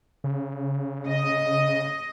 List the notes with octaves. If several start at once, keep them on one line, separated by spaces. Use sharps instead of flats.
C#3
D#5